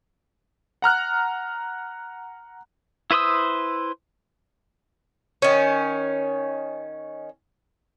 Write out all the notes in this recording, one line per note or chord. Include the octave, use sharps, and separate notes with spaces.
F#5 A#5 F6 F#6
E4 B4 C5 D#6 E6
D#3 C#4